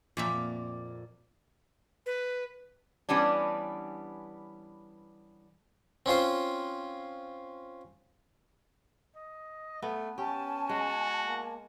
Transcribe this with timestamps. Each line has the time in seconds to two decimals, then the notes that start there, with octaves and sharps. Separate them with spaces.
0.17 F2 A#2 F3 A#3 D5 E5
2.06 B4
3.09 E3 G3 B3 C#4 D4
6.06 C4 C#4 F4 C5
9.16 D#5
9.82 A3 B3
10.18 C#4 G4 G#5 A5
10.69 G#3 F#4
11.25 A#3